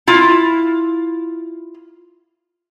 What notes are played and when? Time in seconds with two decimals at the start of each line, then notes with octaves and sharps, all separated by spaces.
0.07 E4 F4